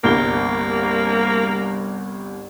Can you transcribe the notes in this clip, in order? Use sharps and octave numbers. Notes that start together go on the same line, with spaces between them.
G1 C2 A#3 G7